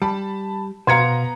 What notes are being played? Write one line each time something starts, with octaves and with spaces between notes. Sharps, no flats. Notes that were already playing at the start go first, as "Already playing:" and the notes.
G3 A5 B5
B2 B3 C5 F5 A#5 C6 G#6 C#7